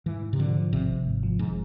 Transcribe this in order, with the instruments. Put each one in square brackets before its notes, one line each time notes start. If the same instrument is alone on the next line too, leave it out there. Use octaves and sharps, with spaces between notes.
[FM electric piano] G#2 [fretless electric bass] E3
[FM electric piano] G#2
[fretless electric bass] C3
[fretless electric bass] D3 [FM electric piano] F3
[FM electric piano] F3
[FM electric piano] G#1 [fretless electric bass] C3
[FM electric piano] G#1
G#2
F3
[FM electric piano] G#1 [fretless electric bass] G#2